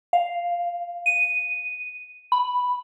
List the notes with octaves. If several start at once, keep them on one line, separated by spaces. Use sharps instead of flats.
F5
D#7
B5